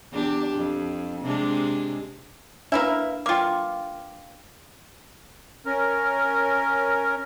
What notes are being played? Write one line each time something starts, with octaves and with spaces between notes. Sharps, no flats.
E2 D4 G4
F2
C3 G#3 D4
A#3 D4 E4 B4 E5
A#3 F4 G5 D6
C#4 A#4